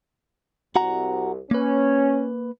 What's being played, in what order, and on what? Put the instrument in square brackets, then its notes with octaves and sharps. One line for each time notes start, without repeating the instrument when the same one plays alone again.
[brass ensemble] C2 [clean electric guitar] F#4 F#5 A#5
[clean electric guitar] A#3 B4 [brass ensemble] C#4